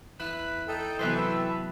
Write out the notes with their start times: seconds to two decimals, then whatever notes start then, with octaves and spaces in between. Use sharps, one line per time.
0.20 E2 E4 B4
0.68 D#4 A4 G5 A5
0.99 C3 E3 F#3 B3 B4 C5 E5
1.15 A3